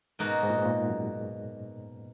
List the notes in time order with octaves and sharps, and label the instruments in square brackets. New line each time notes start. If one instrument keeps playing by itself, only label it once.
[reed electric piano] G#2 [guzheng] B2 A#3 D#4 F#4
[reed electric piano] G#2
A#2
G#2
A#2
F#2